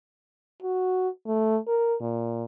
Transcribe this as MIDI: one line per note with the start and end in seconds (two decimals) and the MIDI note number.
0.62 1.08 66
1.27 1.57 57
1.67 1.95 70
2.01 2.44 46